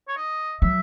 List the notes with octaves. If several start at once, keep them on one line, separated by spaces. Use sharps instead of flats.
C#5
D#5
F#3 E5